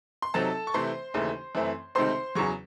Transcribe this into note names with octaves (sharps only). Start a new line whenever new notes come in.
C6
C3 F#3 C4 D#4 A4 A5
C#6
C3 E3 A3 C5 C6
D#2 C#3 E3 A3
F#2 E3 A3 C4
C#2 C3 D#3 A3 C4 C5 C6
E2 C#3 F#3 C#6